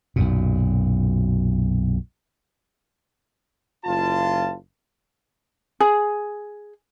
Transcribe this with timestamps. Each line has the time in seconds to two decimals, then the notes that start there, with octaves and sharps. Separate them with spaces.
0.16 B1 F#2 A#2
3.85 F#1 F4 A5
5.80 G#4